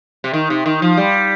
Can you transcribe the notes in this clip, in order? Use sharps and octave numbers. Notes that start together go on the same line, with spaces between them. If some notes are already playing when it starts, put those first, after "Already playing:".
C3
D#3
C3
D#3
F3
G3